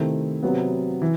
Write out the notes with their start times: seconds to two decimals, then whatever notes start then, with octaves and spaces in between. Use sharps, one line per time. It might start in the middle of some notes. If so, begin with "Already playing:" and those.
Already playing: C3 D#3 A3 C4 E4
0.43 C3 F#3 B3
1.02 E3